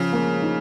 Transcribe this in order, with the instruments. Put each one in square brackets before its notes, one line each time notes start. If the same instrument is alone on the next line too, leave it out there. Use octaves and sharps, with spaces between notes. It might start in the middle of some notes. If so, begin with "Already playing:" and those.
Already playing: [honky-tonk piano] C#3 [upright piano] F3
[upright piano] A#3
D#4